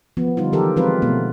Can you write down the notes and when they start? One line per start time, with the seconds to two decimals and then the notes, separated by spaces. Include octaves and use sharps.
0.17 F3 B3
0.37 D3 G3 D#4 F4
0.52 D#3 E3 F#3 G4 A4 A#4
0.76 F3 G#3 C4 F4 B4
1.02 B2 A3 B3